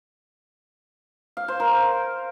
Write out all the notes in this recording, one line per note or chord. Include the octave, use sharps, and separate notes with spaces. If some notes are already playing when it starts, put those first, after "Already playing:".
F5
C5
A#4